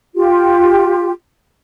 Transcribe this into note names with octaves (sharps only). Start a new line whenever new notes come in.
F4 G4